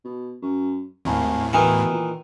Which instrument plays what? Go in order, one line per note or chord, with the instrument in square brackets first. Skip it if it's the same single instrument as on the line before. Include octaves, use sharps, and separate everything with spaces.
[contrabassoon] B2
F#2
[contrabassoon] G#1 [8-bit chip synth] D#2 A2
[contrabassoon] B2 [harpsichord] D#3 E3
[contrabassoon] A#2